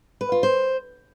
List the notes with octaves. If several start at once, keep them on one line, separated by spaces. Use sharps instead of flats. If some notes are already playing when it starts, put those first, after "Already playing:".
B4
F4
C5